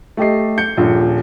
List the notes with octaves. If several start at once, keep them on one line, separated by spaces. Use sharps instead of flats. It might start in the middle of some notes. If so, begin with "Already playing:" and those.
A3 G4 D#5 C7
G6 C#7
D#1 A#1 A#2